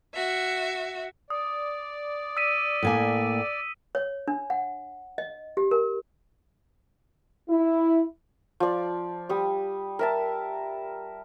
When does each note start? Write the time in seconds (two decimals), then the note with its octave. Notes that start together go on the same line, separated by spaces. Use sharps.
0.14 F#4 E5
1.30 D5 D#6
2.37 E6 B6 D#7
2.82 A2 A#3 G#5
3.95 C#5
4.28 D4
4.50 F#5
5.18 D#5
5.57 G4
5.71 A#4
7.50 E4
8.60 F3 D5
9.29 G3 D#6
9.99 A#4 E5 A5